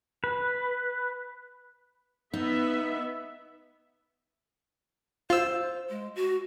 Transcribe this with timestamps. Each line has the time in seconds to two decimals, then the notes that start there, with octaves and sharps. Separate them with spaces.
0.24 B4
2.34 B3 D#4 E5
5.30 F4 C5 E6
5.89 G#3
6.15 F#4